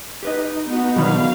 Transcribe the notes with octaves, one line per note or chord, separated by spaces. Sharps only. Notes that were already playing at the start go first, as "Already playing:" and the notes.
D#4 G4 B4 D#5
B3 D#4 F#4
B2 D3 D#3 F#3 F5 B5